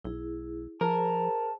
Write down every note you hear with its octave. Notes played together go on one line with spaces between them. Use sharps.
B1 E4 G#4
F3 G#4 A#4 C5 A5